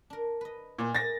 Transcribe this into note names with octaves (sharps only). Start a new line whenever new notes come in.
D4 A#4
B4 D#5
A#2 B3 D#4
A#3 G#4 G#5 A6 A#6